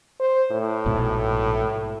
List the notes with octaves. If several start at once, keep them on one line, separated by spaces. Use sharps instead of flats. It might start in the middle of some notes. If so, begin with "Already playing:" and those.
C5
A2
A#1 G#2 B2